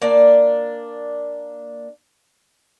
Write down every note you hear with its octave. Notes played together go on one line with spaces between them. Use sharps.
A#3 D4 D5